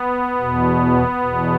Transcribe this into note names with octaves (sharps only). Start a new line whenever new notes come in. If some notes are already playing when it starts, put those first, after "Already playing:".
Already playing: B3
E2 B2
E2 B2